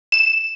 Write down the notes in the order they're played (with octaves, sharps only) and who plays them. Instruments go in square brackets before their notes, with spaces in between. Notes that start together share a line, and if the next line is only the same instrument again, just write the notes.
[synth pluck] E7